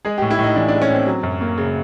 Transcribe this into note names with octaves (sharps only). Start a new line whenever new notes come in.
G#3 G#4
G4
A2
E4
A2 D#4
E3 D4
D4
G#3
C#4
A2 C4
F#3
F#2
A#3
C#3